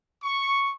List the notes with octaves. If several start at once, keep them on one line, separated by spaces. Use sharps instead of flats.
C#6